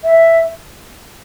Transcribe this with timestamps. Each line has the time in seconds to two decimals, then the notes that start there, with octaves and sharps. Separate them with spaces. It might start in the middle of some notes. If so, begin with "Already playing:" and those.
0.04 E5